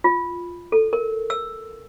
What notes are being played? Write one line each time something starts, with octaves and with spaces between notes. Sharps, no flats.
F4
A4
A#4
E6